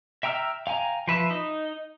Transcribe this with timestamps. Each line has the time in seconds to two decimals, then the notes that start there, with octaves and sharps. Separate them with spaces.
0.23 E5 G5 A#5 E6 F6
0.67 F5 G5 G#5 A#5
1.07 F3 B4 E5
1.31 D#4